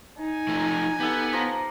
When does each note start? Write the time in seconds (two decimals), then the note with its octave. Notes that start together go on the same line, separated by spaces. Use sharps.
0.18 D#4 G#5
0.48 F3 A3
1.00 B3 G4 A4
1.33 F3 A#5